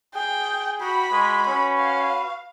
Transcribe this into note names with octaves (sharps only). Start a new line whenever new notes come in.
G#4 G5
F#4 F#5 G5 B5
G#3 F#4 B4
C#4 B5
F5